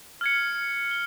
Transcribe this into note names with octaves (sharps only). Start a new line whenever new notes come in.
F6 G#6 C#7
G7